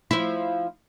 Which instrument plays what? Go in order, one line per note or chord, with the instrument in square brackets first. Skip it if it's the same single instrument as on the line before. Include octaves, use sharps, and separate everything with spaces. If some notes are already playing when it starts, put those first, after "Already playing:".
[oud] F3 E4